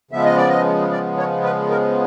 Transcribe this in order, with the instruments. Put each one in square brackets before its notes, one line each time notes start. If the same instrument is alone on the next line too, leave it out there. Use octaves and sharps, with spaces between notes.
[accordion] C#3 F3 G#3 B3 E5
D#5
D5
D#5
D5
C#5
B4
A#4